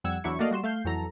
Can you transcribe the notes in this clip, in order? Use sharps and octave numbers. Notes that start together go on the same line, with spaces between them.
F2 G3 F#5 E6 G#6
E2 F#3 D4 E4 C#6
A3 A#3 F#4 D5 D#5 F5
G3 F#4 C6 E7
A3 F5 G6 C7
F2 E3 F#3 A4 A#5